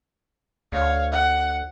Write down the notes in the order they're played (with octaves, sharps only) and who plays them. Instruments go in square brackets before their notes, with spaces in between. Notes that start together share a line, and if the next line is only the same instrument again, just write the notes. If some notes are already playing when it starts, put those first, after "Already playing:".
[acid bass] D2 [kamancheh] C#5 F5
[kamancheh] F#5